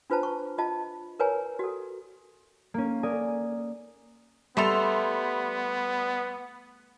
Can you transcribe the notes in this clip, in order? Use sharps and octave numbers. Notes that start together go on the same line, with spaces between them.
D4 F4 B4 C5 A5 A#5
C#6
F4 D#5 A5
A#4 B4 C#5 G#5 A#5
F#4 A4
A#3 C#4
A#4 D5 G#5 D#6
G3 A3 B3 A4 C6 F7